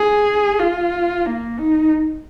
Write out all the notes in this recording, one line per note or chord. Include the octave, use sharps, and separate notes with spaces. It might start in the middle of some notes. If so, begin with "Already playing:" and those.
Already playing: G#4
F4
A#3
D#4